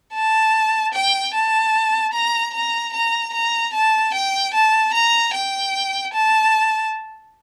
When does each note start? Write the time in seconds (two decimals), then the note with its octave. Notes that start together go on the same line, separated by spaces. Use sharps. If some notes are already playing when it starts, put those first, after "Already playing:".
0.14 A5
0.94 G5
1.34 A5
2.13 A#5
2.54 A#5
2.94 A#5
3.34 A#5
3.73 A5
4.14 G5
4.54 A5
4.93 A#5
5.33 G5
6.13 A5